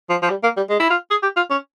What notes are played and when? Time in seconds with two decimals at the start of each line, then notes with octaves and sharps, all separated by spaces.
0.10 F3
0.22 F3
0.30 G3
0.43 A#3
0.57 G3
0.70 G#3
0.80 E4
0.90 F4
1.10 G#4
1.23 G4
1.36 F4
1.50 C#4